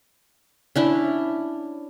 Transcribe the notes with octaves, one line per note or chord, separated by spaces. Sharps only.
C#4 D4 E4